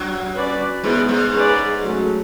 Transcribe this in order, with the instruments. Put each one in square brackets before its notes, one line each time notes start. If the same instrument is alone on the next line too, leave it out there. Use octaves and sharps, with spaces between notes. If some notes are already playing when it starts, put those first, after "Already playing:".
Already playing: [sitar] F#2 F#3
[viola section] C#4 F#4 B4 D5
[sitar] G#2 G#3 [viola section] B3 E4 G#4 B4 D5
[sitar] G#2 G#3
[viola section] C#4 G#4 B4 D5
F#3 A3 C#4